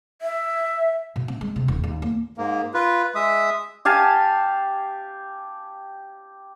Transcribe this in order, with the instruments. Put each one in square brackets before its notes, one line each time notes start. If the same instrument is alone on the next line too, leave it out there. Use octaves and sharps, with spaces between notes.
[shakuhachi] E5
[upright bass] B2
C4
G#3
C3
E1
D#2
A#3
[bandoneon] G#2 A#3
F4 B4
G#3 E5 D#6
[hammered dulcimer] G4 F5 G#5 A5